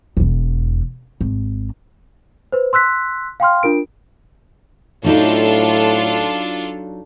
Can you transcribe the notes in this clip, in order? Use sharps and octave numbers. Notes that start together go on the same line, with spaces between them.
E1 E2
G#1
B4 C5
C6 E6 F#6 B6
F5 G5 C6 F6
D4 F4 A#4 D7
A2 F#3 D4 D#4 F4 A4